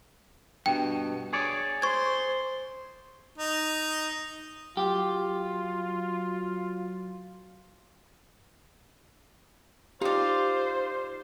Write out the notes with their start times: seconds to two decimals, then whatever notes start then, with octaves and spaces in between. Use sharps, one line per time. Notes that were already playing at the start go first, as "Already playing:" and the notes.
0.66 G2 B2 G5
1.33 G#4 C#5 D5
1.82 C5 C6 C#6 G#6
3.38 D#4
4.77 F#3 F4 G4
10.01 D#4 F4 G4 C5 D5 F5